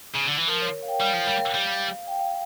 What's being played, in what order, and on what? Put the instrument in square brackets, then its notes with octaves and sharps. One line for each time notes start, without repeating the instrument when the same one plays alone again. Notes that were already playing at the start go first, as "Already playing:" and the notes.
[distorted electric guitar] C#3
D3
E3
[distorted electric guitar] F3 [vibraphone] A#4
[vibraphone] C#5
F5
G5
[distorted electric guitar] G3 [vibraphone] F5
[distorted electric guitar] F3
G3
G3
[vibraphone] G5
F5